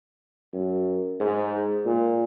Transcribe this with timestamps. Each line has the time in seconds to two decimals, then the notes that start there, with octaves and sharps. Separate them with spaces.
0.53 F#2
1.20 G#2
1.86 A#2